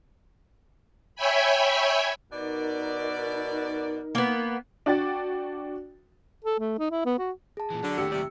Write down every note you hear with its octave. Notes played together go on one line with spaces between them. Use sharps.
C#5 E5 G5 G#5 B5
B2 D#4 A#4 D5
A#3 B3
D4 F#4 D5 G5 A6
A4
A3
D#4
E4
B3
F#4
G#4 A5
A#2 E3
D3 F#3
D#2 A2 G4 E6 C#7
C3 G3